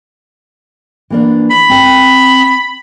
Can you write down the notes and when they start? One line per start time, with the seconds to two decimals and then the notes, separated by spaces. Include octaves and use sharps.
1.10 E3 A#3 D4
1.50 B5
1.69 C4 A5